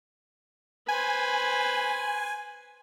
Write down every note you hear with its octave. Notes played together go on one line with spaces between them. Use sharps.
B4 C5 G#5